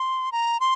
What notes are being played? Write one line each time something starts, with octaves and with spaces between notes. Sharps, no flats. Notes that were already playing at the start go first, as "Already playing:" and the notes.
Already playing: C6
A#5
C6